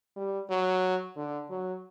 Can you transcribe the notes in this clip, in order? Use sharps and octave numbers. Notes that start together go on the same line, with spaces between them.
G3
F#3
D3
F#3